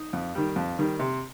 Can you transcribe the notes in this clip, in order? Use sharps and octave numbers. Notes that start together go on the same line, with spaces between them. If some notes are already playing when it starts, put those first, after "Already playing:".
Already playing: D#4
F2
D#3 G3
F2
D#3 G3
C3